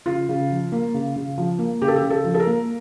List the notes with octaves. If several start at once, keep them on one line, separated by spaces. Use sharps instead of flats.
C#3 F4
C#3
F3
A#3
C#3
C#3
F3
A#3
C#3 G4
A4
G4
C#3
A4
F3
A4
A#4
A#3